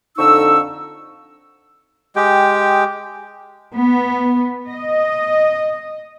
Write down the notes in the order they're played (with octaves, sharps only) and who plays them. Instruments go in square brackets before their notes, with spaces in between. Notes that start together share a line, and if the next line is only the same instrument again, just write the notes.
[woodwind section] F2 D3 D#4 C#6 E6
[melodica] G#3 G4 G5
[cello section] B3
D#5